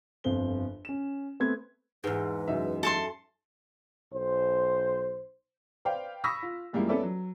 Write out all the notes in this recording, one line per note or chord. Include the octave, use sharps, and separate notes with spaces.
G1 F2 C5 G7
C#4 E7
A3 B3 C4 B4 G#6
E2 G#2 B4
F#2 D#4 E5
A4 A5 C6
B1 C5
B4 C5 D5 F5 G5
B5 C#6 D#6 E6 A#6 B6
F4
F#2 G3 G#3 A#3 E4 F4
B3 C#4 A4 B4 D5 E5
F#3